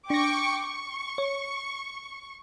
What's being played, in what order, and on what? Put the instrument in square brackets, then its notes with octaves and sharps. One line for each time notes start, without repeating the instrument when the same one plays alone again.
[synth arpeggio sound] D4 A#6 [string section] G5 C#6 D6
[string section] C#6
[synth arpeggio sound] C#5